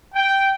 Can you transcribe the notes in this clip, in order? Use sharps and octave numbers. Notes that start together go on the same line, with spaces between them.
G5